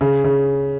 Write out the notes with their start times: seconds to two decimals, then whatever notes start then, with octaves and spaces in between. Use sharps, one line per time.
0.01 C#3
0.24 C#3